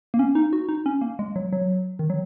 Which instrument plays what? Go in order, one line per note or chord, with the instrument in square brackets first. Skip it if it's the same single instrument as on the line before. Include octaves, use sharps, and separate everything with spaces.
[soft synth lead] A#3
C#4
D#4
F#4
D#4
C#4
A#3
G#3
F#3
F#3
D#3
F#3